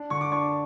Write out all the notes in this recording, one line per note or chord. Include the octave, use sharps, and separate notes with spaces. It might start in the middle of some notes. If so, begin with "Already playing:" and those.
Already playing: D4
D3 C#6
D6
D4 C#6